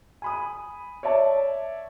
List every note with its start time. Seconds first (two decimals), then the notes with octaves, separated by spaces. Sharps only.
0.22 G#5 B5 D#6
1.03 C#5 D5 E5 A5